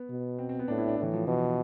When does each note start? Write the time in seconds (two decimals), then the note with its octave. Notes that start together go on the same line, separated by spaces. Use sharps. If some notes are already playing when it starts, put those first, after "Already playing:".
Already playing: B3
0.09 B2
0.39 C4
0.49 C4
0.59 B3
0.68 A2 D4
0.78 E4
0.88 D4
0.98 A2 E3
1.13 F3
1.27 B2 E3